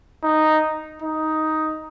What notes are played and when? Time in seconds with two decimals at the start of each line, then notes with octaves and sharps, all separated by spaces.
0.23 D#4
1.02 D#4